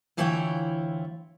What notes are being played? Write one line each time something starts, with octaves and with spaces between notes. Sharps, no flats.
D2 E3 E4 F4 C#5 G5